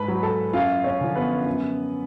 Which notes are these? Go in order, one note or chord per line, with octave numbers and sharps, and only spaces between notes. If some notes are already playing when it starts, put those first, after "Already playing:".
Already playing: G#2 B4 A5 B5
F#3
A4 A5
F#2 F4 F5
C#4 C#5
D3 F3
B3 B4
F#2